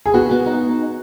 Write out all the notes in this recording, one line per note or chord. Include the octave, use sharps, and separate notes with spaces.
G#4
B3 F#4
B3
D#4